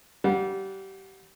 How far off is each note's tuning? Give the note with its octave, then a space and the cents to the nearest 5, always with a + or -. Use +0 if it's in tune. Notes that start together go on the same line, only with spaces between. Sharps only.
G3 -25 F#5 -25